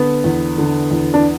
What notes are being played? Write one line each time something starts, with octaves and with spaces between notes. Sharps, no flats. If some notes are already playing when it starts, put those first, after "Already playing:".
Already playing: D3 B3
E2
D3
E2
D4